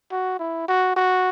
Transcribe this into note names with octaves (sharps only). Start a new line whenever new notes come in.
F#4
E4
F#4
F#4